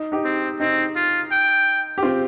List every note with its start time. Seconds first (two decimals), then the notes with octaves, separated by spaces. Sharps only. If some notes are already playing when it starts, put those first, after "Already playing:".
Already playing: D#4
0.12 D#4 G4
0.24 C4
0.60 C4 D#4
0.96 F4
1.31 G5
1.98 G4
2.03 C4 F4